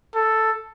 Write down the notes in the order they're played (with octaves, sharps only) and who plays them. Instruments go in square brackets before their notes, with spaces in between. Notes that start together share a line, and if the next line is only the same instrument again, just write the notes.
[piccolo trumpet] A4